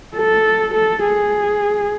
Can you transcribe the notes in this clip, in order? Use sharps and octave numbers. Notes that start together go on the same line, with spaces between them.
A4
A4
G#4